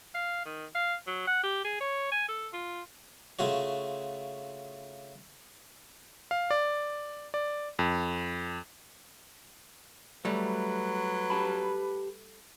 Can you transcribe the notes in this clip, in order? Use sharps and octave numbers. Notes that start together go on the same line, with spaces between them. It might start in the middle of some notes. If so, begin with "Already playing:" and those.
F5
D#3
F5
F#3
F#5
G4
G#4
C#5
G#5
A4
F4
C#3 A3 F4 F#4 C#5
F5
D5
D5
F2
F#3 G3 A3 B4
G4 A5 B5